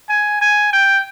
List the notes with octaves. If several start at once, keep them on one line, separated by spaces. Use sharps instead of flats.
G#5
G#5
G5